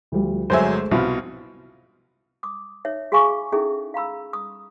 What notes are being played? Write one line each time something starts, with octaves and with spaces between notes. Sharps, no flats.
D2 F3 G3
G1 F#3 G#3 A3 C5 E5 G#5
C2 B2 F3 E4 F#4
D6 D#6
D#4 C#5 E5
F#4 G#4 F5 G#5 C#6 D6
C#4 D#4 E4 G#4 A4 E5
F5 A#5 B5 E6
D#6